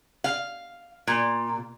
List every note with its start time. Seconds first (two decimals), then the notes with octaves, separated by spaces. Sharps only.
0.24 F5
1.07 A#2